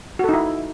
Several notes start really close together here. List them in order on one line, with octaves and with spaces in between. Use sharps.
F#4 A4 D#4 E4